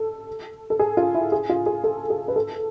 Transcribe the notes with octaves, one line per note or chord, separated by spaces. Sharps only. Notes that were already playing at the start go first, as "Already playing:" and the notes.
Already playing: A4
A4
G#4
F4
E4
G#4
F4
G#4
A4
G#4
B4
A4